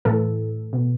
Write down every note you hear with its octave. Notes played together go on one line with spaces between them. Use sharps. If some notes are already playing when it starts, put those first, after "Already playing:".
A2 E3 A4
B2